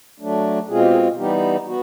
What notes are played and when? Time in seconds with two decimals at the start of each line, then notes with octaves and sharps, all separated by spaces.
0.20 F#3 A3 D4
0.69 B2 G#3 C4 F4 G#4
0.80 G4
0.90 G#4
1.18 E3 G3 B3 D#4 G4
1.67 B3 F#4